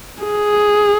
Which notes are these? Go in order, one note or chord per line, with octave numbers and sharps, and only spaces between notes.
G#4